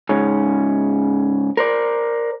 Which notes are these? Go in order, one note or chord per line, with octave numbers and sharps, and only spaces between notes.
G#2 C#3 C#4
A#4 C5 D5